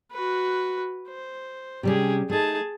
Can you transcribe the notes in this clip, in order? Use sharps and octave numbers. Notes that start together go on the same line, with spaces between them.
F#4 B4
C5
C3 G3 C#4 G4 G#4
A3 D#4 G#4 A5